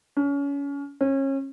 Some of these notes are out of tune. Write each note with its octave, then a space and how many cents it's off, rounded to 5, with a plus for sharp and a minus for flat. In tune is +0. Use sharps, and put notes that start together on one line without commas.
C#4 +30
C#4 -30